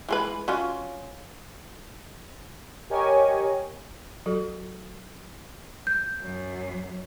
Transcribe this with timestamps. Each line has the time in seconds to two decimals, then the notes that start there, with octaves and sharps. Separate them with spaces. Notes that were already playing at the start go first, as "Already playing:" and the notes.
0.09 E3 G#3 B4
0.48 F#3 C#4 F4
2.90 G4 A#4 C#5 D#5 G#5 C#6
4.26 F#3 F#4 A4
5.87 G6
6.20 F#2